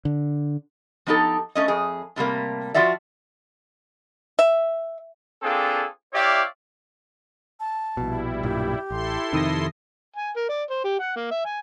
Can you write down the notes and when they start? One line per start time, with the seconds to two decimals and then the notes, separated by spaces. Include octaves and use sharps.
0.05 D3
1.07 F3 B3 D#4 G4 A4
1.55 A3 C#4 D#5
1.68 F2 G#4
2.16 A2 C3 G3 A#3
2.74 F3 G3 F4 F#4 D5 E5
4.39 E5
5.43 A#3 C4 D4 F4 G#4 A4
6.13 E4 G4 C#5 D5 E5 F5
7.60 A5
7.97 A#1 B2 G3 E4
8.43 B1 G2 A#2 G4
8.91 A1 E4 A4 C6
9.33 F2 C3 D#3 D#6 A#6
10.17 G#5
10.36 A#4
10.49 D5
10.70 C5
10.84 G4
11.00 F#5
11.16 A#3
11.31 E5
11.45 G#5